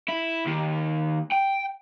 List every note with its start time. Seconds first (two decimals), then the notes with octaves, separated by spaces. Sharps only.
0.08 E4
0.46 D#2
1.32 G5